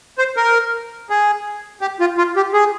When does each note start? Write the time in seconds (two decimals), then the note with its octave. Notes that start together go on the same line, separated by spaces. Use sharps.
0.18 C5
0.36 A#4
1.10 G#4
1.81 G4
2.00 F4
2.18 F4
2.36 G4
2.54 G#4